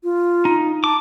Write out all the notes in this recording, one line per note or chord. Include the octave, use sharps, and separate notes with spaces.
F4
D#4
A5 D6